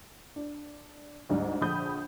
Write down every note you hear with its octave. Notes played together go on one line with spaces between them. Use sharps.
D4
D2 G#2 G3
A#1 D3 B5 D#6 G6